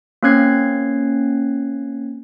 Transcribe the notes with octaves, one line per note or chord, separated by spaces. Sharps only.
A#3 C4 C#4 F#6 G#6 C7